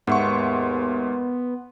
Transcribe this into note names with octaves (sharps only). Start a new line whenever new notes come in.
D#2 G#2 B3 E5 F#5 C6 C#6